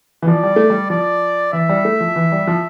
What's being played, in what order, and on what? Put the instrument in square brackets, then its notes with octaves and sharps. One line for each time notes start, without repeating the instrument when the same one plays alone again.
[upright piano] E3
[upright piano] F3 [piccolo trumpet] D5
[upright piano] G3
A3
G3
[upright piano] F3 [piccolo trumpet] D5
[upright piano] E3 [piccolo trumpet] E5
[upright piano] G3
A3
F3
E3
G3
F3